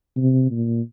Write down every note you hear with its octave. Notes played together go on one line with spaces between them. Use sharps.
C3
A#2